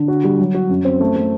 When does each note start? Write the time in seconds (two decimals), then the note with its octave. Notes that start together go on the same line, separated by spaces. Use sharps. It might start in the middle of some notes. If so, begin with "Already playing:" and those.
Already playing: D3
0.08 F#4
0.24 G3
0.39 F#3
0.54 F#4
0.69 F#2
0.85 C4
1.00 A3
1.16 A3